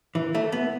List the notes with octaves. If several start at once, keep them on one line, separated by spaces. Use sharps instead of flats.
E3
A3
B3